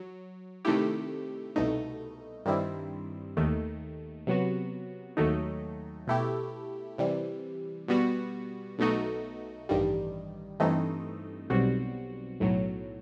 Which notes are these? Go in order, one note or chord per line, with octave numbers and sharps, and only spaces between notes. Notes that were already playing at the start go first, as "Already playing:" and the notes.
Already playing: F#3
C3 D#3 A3 E4 G4
C2 B2 A3 D#4
G2 D#3 G3 C4 E4
D#2 D#3 A3
C3 F#3 B3 F#4
D#2 D#3 F#3 A3 D#4
B2 A3 E4 G4
C3 E3 G3
B2 G3 B3 F#4
B1 B2 A3 D#4 F#4
A1 G2 D#3 G3
G2 E3 A3 C4 D#4
B1 B2 G3 C4 F#4
B1 A2 F#3